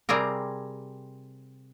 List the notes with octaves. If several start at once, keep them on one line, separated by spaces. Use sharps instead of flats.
C3 G3 C4 G#4 A#4